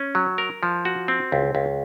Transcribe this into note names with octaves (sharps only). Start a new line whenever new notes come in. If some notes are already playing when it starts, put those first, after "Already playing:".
Already playing: C#4
F#3
A#4
F3
F#4
C4
C#2
C#2